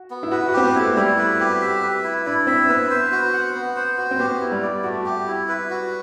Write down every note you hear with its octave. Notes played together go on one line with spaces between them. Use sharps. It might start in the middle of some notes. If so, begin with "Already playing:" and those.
Already playing: F#4
B3
E4
F#4 B4
F#4
C4 G4
B3
A3 E4
G3 E4
B4
G4
E5
B4
E4
D4 E4
C4 E5
B3 B4
C5
F#4
F#5
B3
C5
F#4
C4
B3 G4
E4
G3
D5
A3 F#4
G4
E4
B4
F#4